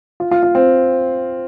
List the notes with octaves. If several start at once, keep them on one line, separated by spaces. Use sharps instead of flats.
F4
F4
F4
C4